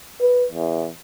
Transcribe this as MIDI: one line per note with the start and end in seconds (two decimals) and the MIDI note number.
0.21 0.46 71
0.52 0.89 40